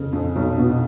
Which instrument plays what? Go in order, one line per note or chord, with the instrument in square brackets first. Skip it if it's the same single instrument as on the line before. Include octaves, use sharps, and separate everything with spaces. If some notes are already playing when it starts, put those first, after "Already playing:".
Already playing: [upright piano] F2 C#3
F2
B1
B2